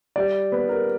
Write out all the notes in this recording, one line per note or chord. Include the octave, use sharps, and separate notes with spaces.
G3 D5
B3 B4
A#4